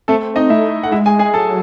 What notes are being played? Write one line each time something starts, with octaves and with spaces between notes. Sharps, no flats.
A3 C4 A4
D#4 D#5
A3 E4 E5
A3 F#5
G#3 E4 E5
G#4 G#5
G#4 G#5
F#3 A4 A5